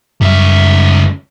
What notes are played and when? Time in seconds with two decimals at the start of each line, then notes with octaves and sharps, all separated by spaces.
0.21 C#2 F#2 G3 E5